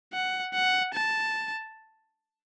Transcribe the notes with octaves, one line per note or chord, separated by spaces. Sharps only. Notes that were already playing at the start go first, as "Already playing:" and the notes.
F#5
F#5
A5